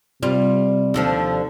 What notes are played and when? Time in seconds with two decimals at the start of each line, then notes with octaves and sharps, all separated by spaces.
0.23 C3 G3 F4
0.94 D#2 D3 F3